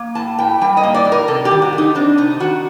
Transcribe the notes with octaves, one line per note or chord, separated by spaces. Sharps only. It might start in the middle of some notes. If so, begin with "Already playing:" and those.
Already playing: A#3
A2 A5
A2 G5
G3 G5
D#5
A#3
D5
A2
A#4
C3 A4
G4
D#3
F#4
A3
D#4
C4 D4
C3 D#4
D#3 F#4